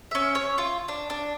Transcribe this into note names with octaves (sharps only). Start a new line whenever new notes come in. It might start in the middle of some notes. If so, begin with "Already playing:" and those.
C#4 E5
C#5
F4
D4
D4